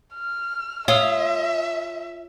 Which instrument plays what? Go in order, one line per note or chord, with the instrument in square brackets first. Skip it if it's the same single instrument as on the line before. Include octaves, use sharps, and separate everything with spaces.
[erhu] F6
[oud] F4 [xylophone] C#5 D#6 E6 [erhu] E5